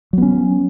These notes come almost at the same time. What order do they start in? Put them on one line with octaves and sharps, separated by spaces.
F#3 B3 C#4